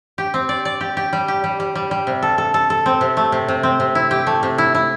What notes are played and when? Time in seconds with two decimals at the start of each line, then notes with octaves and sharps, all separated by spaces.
0.18 G4
0.34 C4
0.49 D5
0.65 D5
0.81 G4
0.97 G4
1.13 G3
1.28 G4
1.44 G3
1.60 G3
1.75 G3
1.91 G3
2.07 C3
2.22 A4
2.38 A4
2.54 A4
2.70 A4
2.86 C4
3.01 C3
3.17 A3
3.32 C3
3.48 C3
3.63 C4
3.80 C3
3.95 E4
4.11 G4
4.27 A3
4.43 C3
4.58 E4
4.75 E4